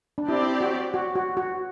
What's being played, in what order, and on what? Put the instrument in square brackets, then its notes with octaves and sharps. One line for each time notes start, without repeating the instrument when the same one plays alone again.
[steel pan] D4
[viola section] C4 G4 D5 [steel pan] E4
[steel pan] F#4
F#4
F#4
F#4